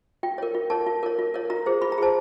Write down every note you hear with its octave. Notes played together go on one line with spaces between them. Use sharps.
F4 G5
A#4 C#5
F4
A#4 C#5 A5
F4
A#4 C#5
F4
A#4 C#5
F4 A#5
G#4 C5
F4 B5
A#5
G#4 C5 A5